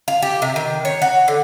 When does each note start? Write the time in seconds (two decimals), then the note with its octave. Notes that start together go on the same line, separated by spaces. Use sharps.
0.08 F5
0.22 G4
0.42 C3
0.56 D#3
0.85 C#5
1.02 F#4
1.28 D3